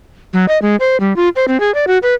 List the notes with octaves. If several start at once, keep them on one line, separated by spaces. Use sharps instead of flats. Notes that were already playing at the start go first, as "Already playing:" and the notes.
F#3
D#5
G#3
C5
G3
F4
C5
C4
G#4
D5
F#4
B4